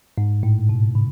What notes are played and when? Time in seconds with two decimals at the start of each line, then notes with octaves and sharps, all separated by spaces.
0.18 G#2
0.43 A2
0.69 B2
0.95 C#3